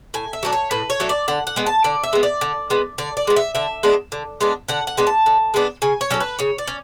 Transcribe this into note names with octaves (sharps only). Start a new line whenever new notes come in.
A2 G#5
E5
F#3 A3 D4
C#5
A2 B4
C#5
F#3 A3 D4
D5
D3 F#5
F#5
G#3 B3
A5
D3 D5
E5
G#3 B3
D5
D3
G#3 B3
D3 D5
D5
G#3 B3
E5
D3 E5
G#3 B3 D4
D3
G#3 B3 D4
D3 F#5
F#5
G#3 B3 D4
A5
D3
G#3 B3 D4
C#3 G#5
C#5
F#3 C#4 A4
B4
C#3 C#5
D5
C#4